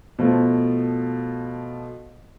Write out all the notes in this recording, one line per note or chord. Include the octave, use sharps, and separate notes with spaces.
B2 F3 A3